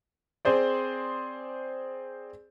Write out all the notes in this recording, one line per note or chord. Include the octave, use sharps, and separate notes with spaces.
C4 G#4 C5 D5